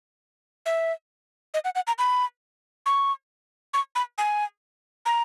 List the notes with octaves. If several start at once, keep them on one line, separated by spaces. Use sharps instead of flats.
E5
D#5
F#5
F#5
A#5
B5
C#6
C#6
B5
G#5
A#5